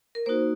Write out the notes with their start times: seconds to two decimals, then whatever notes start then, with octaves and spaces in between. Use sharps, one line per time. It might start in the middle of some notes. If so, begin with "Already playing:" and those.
0.15 A#4
0.26 A#3 D#4 F#4 C5